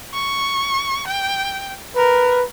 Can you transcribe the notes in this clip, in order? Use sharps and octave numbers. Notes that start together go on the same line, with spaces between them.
C#6
G5
A#4 B4